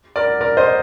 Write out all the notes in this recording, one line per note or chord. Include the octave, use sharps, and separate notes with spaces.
A#4 D5
A#4 D5
C5 D#5